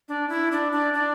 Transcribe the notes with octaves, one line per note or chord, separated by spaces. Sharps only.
D4
E4
D4
D4
D4